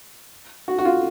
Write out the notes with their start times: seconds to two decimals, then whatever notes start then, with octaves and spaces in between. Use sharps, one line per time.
0.68 F#4
0.79 F#4
0.85 F4